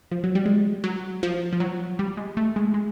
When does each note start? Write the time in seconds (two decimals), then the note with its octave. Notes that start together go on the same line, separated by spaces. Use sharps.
0.11 F3
0.24 F#3
0.35 G3
0.46 G#3
0.84 F#3
1.23 F3
1.53 F3
1.60 F#3
1.99 G3
2.17 G#3
2.37 A3
2.56 G#3
2.74 G#3